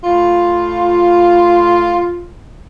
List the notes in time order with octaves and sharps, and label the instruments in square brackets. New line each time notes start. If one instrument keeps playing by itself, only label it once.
[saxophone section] A2 F4